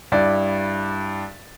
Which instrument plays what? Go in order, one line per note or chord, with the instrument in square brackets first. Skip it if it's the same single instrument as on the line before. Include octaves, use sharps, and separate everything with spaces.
[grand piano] G2 E4 D5